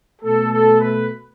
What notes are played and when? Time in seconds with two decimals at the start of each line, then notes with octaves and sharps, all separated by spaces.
0.22 B2 A3 A4
0.51 A4
0.80 B4